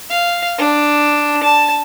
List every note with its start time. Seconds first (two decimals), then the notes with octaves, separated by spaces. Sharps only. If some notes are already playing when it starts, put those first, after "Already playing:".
0.10 F5
0.58 D4
1.43 A5